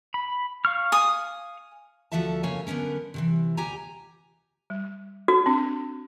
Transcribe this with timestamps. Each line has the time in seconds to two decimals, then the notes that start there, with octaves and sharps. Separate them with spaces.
0.14 B5
0.65 F5 C#6 F6
0.92 G#5 D#6
2.12 D2 F3 F#4 A4 E5 A5
2.43 F2 C#3 A#3 C#5 G#5
2.67 D3 F#3 B3 C#4 A#4
3.14 C3 D#3 E3
3.57 D2 G4 G5 G#5 A#5
4.70 G3
5.28 F#4
5.46 C4 D4